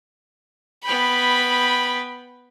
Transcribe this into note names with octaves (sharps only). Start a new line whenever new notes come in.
B3 G5 B5